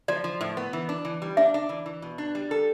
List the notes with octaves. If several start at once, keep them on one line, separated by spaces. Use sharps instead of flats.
F3 D5
F3
A2
B3
E3
D4
E3
G3
D4 E5
D4
E3
E3
B2
D4
G3
A4